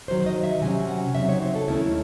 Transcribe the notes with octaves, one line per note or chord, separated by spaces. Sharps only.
C3 D#3 F#3 C5
D#5
E5
C3 F#3 C#4 G#5
F#5
C#3 F#3 C4 D#4 E5
C#5
C5
A4
D#2 D#3 A3 C#4 E4